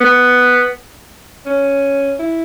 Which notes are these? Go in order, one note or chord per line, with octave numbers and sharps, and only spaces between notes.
B3
C#4
E4